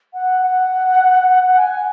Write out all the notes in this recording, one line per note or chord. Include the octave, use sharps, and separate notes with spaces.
F#5
F#5
G#5